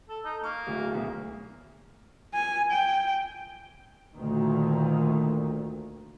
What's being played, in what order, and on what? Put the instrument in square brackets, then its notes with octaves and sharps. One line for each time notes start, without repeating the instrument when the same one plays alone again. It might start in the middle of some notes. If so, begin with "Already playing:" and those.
[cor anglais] A4
D#4
[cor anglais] A#3 [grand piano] C#6
[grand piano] D1 D2
D2 B2 F#3
[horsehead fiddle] G#5
G5
[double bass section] D2 A#2 D#3